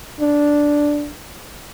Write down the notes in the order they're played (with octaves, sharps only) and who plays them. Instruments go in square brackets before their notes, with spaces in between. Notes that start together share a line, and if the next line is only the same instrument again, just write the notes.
[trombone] D4